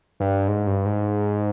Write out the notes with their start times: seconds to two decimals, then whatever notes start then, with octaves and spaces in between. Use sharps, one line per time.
0.20 G2
0.48 G#2
0.67 G2
0.86 G#2